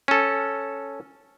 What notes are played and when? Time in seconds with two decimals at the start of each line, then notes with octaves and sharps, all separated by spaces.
0.08 C#4 A4